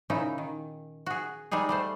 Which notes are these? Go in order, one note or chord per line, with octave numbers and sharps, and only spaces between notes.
A#2 C#3 C#4 D#4 E4
D#3
F#4 G#4
G3 G#3 D#4 G#4
G3 A3 C5